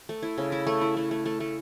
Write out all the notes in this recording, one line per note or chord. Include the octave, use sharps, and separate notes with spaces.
A3
E4
C#3
E4
A3
E4
A3
A3
A3
A3